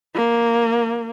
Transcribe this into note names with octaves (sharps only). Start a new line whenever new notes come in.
A#3